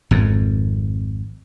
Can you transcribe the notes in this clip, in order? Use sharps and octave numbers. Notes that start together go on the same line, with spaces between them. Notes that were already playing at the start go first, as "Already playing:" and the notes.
G#1 F2